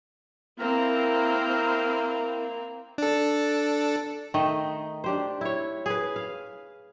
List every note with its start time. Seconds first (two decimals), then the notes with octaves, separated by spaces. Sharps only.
0.60 A#3 C4 E4 A#4
2.98 D4 A4
4.34 D#3 A3 D#5 G5
5.04 D4 G4 C5
5.41 E4 C#5
5.86 G#4 B4
6.16 F5